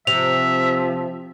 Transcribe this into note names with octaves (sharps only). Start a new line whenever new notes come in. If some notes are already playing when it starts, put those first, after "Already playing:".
C3 F3 E5 F7